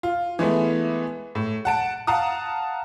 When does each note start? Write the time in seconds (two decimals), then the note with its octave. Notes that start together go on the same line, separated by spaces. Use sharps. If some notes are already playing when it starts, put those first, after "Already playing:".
0.03 F4
0.39 E3 G#3 A3 B3
1.35 A2
1.65 F#5 A5 D7
2.07 F5 F#5 A5 A#5 D#6